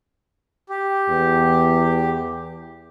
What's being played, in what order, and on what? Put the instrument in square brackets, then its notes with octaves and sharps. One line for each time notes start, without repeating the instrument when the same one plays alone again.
[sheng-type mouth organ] G4
[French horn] E2